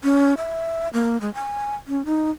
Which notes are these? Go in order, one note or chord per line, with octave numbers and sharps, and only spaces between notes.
C#4
E5
A#3
G#3
G#5
C#4
D#4